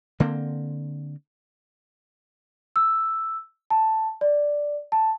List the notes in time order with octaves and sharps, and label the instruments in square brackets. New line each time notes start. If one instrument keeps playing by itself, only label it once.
[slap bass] D3 A#3 C4
[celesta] E6
A5
D5
A5